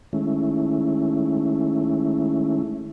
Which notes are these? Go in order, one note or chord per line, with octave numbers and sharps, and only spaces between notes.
D#3 G#3 A3 C#4 E4